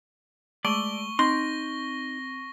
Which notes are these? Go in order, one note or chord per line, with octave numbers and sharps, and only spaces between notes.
G#3 A3 D5 C#6 G7
C4 D#4 C6 A#6